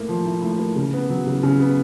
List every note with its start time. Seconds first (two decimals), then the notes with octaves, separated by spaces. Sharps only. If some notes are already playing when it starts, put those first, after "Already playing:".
Already playing: A2 A#3
0.09 F3
0.25 A2
0.42 A2
0.59 A#3
0.76 C#3
0.93 B3
1.10 F#3
1.27 C#3
1.43 C#3
1.60 B3